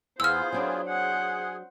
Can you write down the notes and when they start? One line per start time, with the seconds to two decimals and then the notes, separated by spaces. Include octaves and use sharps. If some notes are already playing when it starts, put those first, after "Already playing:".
0.20 E2 B3 F4 G#4 C5 E6 F6
0.53 F#3 C4 D4
0.88 G#4 C5 F#5